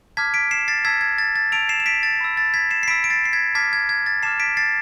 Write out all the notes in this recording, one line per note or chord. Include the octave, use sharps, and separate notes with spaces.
A5 D6 F6 G#6 B6
B6 D7
C7 E7
A6 C7
A5 E6 G#6 B6
G#6
A6
A6
A5 E6 D7 F7
C7 E7
E7
B6 D7
A6
B5 E6
A6
G#6 B6
C7 E7
C7
B5 E6 B6 D7
D7
A6 C7
C7
G#6 B6
A5 D6 F6 G#6 B6
G#6
G#6
A6
A5 D6 F6 C7 E7
B6 D7
A6 C7